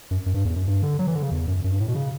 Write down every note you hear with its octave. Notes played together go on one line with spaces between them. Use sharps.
F#2
F#2
G2
E2
F#2
G2
D3
F#3
E3
D3
C#3
E2
F#2
F#2
G2
A2
B2
C#3